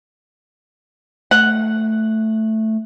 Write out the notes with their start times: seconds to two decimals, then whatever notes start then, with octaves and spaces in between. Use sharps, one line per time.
1.31 A3 F#5